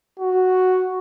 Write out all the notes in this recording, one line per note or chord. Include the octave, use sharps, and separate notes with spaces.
F#4